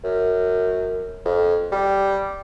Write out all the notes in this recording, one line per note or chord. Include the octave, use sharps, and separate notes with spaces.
F#2
F2
G3